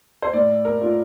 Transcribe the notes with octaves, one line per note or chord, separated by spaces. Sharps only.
C5
A2 D5
A#4
A3 D4 F4